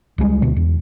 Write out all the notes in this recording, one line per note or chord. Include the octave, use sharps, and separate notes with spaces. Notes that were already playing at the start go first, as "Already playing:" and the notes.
C#2 G3 G#3
D2 B2
E2